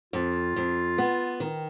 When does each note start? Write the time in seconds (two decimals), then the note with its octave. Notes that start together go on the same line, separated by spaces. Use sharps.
0.13 F2 F4
0.56 F2
0.98 B3
1.40 D#3